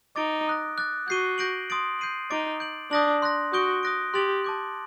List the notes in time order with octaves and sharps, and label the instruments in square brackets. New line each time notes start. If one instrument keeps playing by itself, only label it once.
[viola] D#4 [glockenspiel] D6 A6 D7 G7
[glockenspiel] D#6 F#6 A#6
D6 F#6 A6
[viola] F#4 [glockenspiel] G6 C7 D#7 G7
[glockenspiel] G6 A#6 D7 F#7
C6 D#6 A6 D7 F#7
G6 C7 D#7 F#7
[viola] D#4 [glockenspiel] D6 A6 D7
[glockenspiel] G6 D7 F#7
[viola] D4 [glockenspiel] D#6 G6 A#6 F#7
[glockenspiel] C6 F#6 A#6
[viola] F#4 [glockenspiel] D#6 G6 D7 G7
[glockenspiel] D#6 F#6 A#6 D7
[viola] G4 [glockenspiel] C6 F#6 A6 D7 F#7
[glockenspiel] A5 D6 G6